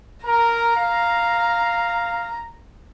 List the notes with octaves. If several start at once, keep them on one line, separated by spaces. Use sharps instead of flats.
A#4 A#5
F5